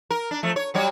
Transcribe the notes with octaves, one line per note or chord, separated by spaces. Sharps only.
A#4
D4
F3 A3
C#5
F#3 G3 C#5